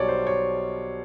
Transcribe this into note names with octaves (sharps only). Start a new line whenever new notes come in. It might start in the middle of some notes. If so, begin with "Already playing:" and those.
Already playing: B1 B2 G3 C#5 D5
C5
C#5